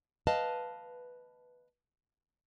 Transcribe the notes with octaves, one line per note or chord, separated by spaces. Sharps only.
B4 D#5 F5 A5